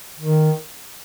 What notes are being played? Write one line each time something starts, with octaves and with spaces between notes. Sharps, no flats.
D#3